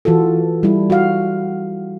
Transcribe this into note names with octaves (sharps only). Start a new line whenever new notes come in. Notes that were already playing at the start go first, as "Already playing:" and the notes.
E3 F4 F#4 A4
G3 E4
F#4 F5